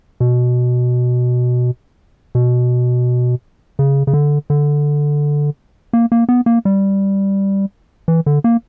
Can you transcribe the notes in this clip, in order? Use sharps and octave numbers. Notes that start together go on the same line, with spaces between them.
B2
B2
C#3
C#3
D3
D3
A#3
A#3
B3
A#3
G3
E3
D3
A#3